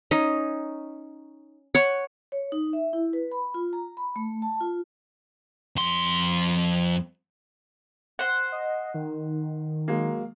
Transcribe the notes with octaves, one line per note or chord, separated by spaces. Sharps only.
C#4 D#4
C#5 F#5 C#6
C#5
D#4
E5
E4
B4
B5
F4
A#5
B5
A3
A5
F4
F2 C6
C5 F#5
D#5
D#3
F#3 G#3 A#3